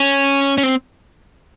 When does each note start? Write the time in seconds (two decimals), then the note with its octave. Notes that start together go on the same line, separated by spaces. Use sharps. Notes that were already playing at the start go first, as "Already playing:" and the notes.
Already playing: C#4
0.58 C#4
0.63 C4